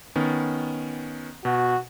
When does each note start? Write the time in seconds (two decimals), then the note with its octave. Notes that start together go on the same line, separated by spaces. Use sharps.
0.15 D#3 B3 C#4
1.45 B2 F#4